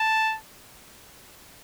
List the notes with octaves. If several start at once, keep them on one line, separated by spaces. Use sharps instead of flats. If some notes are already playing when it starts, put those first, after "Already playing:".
Already playing: A5